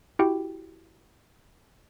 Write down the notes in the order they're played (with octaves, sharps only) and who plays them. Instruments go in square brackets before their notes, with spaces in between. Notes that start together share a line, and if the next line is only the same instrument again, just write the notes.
[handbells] E4 F#4 G4 G5